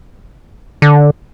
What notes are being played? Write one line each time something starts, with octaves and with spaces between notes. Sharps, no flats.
D3